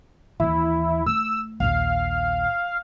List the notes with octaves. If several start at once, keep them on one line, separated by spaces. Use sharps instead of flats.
D#2 E3 E4
A3 E6
A#1 D#2 F5